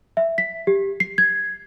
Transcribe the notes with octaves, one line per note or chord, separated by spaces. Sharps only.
E5
B6
G4
C7
G#6